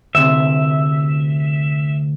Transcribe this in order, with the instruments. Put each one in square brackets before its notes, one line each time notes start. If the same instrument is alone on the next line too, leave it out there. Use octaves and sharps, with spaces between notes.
[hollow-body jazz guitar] D2 C3 [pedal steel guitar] E5